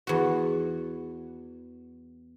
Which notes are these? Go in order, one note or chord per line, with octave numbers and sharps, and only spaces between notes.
E2 F#4